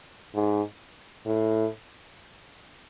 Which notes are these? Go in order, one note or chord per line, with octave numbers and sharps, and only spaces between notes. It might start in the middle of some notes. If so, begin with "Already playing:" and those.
G#2
A2